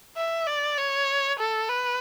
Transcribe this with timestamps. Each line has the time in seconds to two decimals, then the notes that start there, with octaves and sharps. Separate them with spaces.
0.17 E5
0.47 D5
0.78 C#5
1.39 A4
1.69 B4